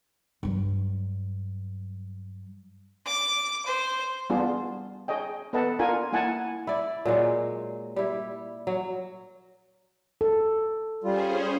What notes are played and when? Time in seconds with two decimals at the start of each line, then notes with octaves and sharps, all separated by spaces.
0.43 G2 F#3
3.06 D6
3.66 C5
4.30 G3 B3 D4 F4 G#4
5.08 G#4 C#5 D#5 G5
5.53 B3 A4 B4 D#5 F#5 A5
5.79 D4 F4 A#4 G#5
6.12 A#3 E4 F#5 G#5 A5
6.67 E4 D5
7.06 A#2 F#3 G#3
7.96 G3 E4
8.67 F#3
10.21 A4
11.04 G3 C#4 F4 G#4 C5